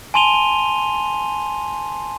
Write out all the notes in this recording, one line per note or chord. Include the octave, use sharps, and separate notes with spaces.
G#5 A5 C6 D#7 F7 G7